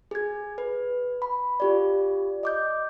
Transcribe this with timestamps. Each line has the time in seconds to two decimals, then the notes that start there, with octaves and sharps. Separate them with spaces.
0.11 G#4 G#6
0.58 B4
1.22 B5
1.60 F4 G4 D5
2.43 D#5 D6 G6